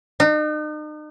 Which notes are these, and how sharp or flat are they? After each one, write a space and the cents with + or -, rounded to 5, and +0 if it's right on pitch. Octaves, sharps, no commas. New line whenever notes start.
D#4 -40